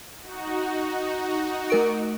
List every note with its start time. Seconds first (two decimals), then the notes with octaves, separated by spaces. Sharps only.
0.21 D#4 F#4
1.70 A3 A#4 D7